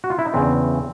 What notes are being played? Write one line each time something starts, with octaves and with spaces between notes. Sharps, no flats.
F#4
F4
E4
D#4
E2 C#3 E3 C4 D4